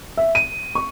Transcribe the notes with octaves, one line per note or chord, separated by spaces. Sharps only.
E5
D#7
C#6